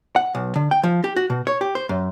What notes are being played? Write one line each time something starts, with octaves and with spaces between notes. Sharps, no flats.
F#5
B1
D3
G5
F3
G4
F#4
B2
C#5
G4
C5
F#2